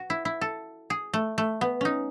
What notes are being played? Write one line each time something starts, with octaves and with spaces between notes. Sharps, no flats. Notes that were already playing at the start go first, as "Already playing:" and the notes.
Already playing: F#4
E4
E4
A4
G#4
A3
A3
B3
C#4 D#4